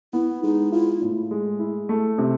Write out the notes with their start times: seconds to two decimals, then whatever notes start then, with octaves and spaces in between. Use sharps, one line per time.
0.13 B3 E4
0.43 G#3 D#4
0.72 E4 F4
1.02 A2
1.31 G#3
1.59 E4
1.89 A3
2.18 C3